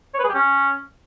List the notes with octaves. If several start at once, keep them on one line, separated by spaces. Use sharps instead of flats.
C#5
B4
G#4
G4
C#4